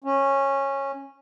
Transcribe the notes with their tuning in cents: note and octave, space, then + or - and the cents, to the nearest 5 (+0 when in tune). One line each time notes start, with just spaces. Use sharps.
C#4 -15